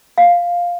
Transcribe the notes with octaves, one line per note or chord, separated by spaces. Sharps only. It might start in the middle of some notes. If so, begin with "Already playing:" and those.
F5